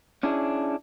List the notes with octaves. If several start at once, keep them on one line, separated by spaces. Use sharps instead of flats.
C#4 D4 E4 G#4